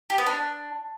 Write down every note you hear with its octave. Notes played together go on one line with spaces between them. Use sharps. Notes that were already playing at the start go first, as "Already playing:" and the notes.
G4
B3
D4